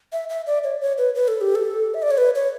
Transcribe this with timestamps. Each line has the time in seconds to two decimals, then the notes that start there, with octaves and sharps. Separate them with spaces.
0.13 E5
0.29 E5
0.47 D5
0.64 C#5
0.81 C#5
0.98 B4
1.15 B4
1.28 A4
1.41 G4
1.55 A4
1.94 E5
2.02 D5
2.11 C#5
2.18 B4
2.35 C#5